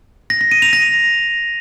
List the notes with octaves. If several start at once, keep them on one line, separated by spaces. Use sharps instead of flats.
A#6
A#6
D#7
F7
A#6